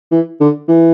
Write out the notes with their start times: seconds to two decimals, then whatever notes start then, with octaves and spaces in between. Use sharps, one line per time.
0.11 E3
0.40 D3
0.68 E3